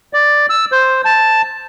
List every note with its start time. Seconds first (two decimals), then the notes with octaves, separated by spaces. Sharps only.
0.13 D5
0.50 E6
0.72 C5
1.05 A5